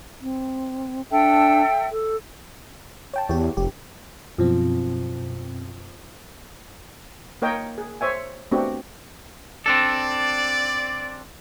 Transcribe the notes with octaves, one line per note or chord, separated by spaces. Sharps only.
C4
D4 A4 E5 G5
A4
C#5 G5 A5
E2 G4 C#5
F1 G4
F#2 B2 F3 C4
A#3 A#4 C#5 D#5 G5
G#4
C5 C#5 E5 G#5
A3 B3 C4 D4 F#4 G4
C4 D4 A4 D5